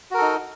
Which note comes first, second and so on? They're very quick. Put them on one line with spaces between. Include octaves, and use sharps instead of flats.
F#4 A#4 A4 D#4